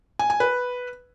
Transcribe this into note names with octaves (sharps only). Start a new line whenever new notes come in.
G#5
G#5
B4